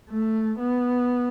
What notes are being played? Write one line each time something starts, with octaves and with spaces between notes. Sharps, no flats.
A3
B3